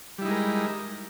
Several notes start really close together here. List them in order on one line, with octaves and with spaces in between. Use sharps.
G3 E4 D#4 G#3 A#4